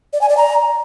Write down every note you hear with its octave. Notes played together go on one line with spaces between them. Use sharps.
D5
G#5
D5
A#5